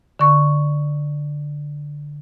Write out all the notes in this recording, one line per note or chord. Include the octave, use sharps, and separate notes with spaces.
D3 C#6